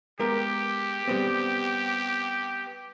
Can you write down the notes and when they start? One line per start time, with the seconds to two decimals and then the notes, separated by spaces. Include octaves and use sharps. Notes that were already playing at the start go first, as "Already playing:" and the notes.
0.20 G#3 B3 G4 A#4
1.08 G3 B3 C4